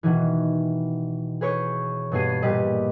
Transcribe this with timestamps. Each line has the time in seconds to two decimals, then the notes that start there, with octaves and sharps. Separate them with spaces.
0.03 B2 D#3 E3
1.41 G#4 B4 C#5 G6 C#7
2.12 G2 B2 B3 G#4 C7 D#7
2.42 A#2 G3 G4 B4 D#5 D#7